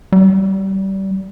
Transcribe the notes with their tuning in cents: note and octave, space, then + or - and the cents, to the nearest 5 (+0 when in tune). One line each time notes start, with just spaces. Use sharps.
G3 -25